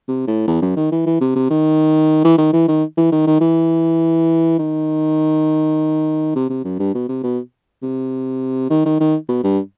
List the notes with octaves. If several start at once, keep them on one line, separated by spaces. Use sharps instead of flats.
C3
A2
E2
F#2
D#3
E3
E3
C3
C3
D#3
E3
D#3
E3
D#3
E3
D#3
D#3
E3
D#3
C3
C3
F#2
G2
B2
C3
B2
C3
D#3
D#3
D#3
B2
G2